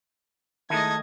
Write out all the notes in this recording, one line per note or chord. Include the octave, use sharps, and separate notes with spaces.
D#3 G#3 A3 D#4 E4 D#5 A5 G#6